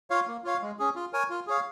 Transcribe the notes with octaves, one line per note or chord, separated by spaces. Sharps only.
F4 C#5 F5
A#3
F4 C#5 F5
G#3
C#4 G#4
F4
A#4 C#5 G#5
F4
G#4 C#5 F5